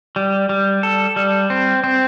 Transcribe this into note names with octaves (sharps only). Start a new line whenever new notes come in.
G3
G3
A4
G3
C4
C4